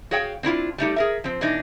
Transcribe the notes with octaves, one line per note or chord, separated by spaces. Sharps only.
F#4 G#4 C#5 F5 G5
C4 D4 E4 F4
G3 A3 D#4 G4
G#4 A#4 E5
F3 C4
B2 E3 D4 D#4